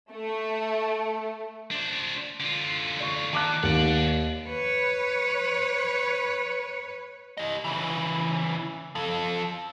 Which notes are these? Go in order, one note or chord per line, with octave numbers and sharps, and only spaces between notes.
A3
D4 C5
D3 F4
D5 C#6
D#3 A5 D6 F#6
D#2 D5 F#5
B4 C#5
G4 D#5
C#3 E3
F3 A4